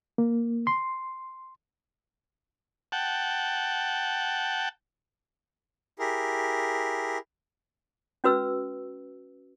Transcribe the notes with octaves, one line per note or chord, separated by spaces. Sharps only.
A#3
C6
F#5 G5 A5
E4 G4 G#4 A#4
C#4 F#4 B4 E6